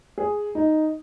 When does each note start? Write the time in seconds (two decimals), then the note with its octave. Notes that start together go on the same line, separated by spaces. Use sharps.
0.18 G#4
0.55 D#4